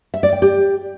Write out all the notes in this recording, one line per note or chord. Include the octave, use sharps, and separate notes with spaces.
E5
D5
G5
G4